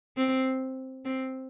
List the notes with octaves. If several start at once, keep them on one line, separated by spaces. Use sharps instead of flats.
C4
C4